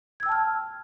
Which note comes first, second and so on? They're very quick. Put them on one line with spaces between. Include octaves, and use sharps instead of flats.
G#6 E6 G5 A5 F6